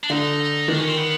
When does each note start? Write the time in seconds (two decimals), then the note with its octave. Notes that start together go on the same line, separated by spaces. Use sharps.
0.03 D4
0.10 D3 D#4
0.68 D#3 D4
0.79 C#4
0.88 C4
0.98 B3